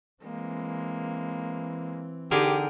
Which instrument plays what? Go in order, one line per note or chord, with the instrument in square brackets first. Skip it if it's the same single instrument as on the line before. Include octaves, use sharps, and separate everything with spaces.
[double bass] E3 C4 [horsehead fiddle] G#3 A#3
[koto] D3 G#4 A#4 [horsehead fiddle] D#4 G5 [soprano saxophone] G4